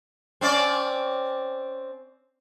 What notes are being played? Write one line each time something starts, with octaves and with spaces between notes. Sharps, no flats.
C4 C#4 D5